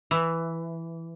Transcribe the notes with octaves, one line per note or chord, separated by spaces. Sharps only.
E3